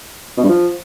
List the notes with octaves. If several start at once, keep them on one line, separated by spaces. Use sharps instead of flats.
B2
G2
F3